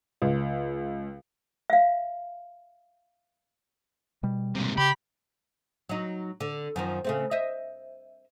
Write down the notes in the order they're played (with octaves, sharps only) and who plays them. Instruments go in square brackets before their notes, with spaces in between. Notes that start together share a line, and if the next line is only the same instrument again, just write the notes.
[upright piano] C#2
[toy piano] E5 F5
[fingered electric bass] B2 G3
[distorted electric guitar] G#2 C3
[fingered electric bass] C#3 [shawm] G4 [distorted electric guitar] B5
[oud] F#3 D#4
D3
F#2 D#3 F3
C#3 A3 C4
C5 D#5 E5